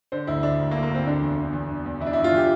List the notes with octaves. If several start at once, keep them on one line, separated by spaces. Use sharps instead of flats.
D3 C5
D2 E4
D3 D4
D2
A#3
D3
A#3
D2 C4
D3 D4
E2
D3
E2
D3
E2
E3 E4
D4
G2 E4
F4
E3 G4